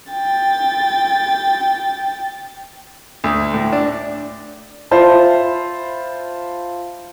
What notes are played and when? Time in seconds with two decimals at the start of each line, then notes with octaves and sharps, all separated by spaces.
0.11 G5 A6
3.24 D2
3.54 A2
3.73 D4
4.91 F4 C5 E5 A5 B5